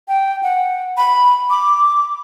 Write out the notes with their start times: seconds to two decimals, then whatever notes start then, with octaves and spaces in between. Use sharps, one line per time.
0.08 G5
0.43 F#5
0.97 B5
1.50 D6